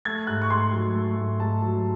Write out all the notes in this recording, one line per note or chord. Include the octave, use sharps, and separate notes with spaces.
A3 G#6
G#2 F#6
C#6
G#2 C6
F#3
A3
G#2
G#2 A5
F#3